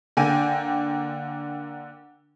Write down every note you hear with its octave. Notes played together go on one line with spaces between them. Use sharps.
D3 A#3 G5 G#5 D#7